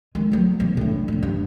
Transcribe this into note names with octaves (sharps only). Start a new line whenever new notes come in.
D#3 G#3
F#3 A3
B2 D#3
A2 D3
A2 D3
G2